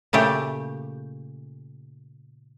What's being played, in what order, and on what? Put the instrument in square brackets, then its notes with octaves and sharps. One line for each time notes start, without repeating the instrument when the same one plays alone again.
[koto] A#2 C#3 A3 G4